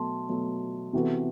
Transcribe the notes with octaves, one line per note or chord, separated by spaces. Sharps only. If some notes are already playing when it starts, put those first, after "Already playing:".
Already playing: B2 F#3 A3 A5 C6
B2 F#3 A3
C3 E3 B3 F#4 A4